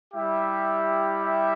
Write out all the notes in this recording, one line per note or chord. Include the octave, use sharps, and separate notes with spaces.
G3 E4 G4 E5
E5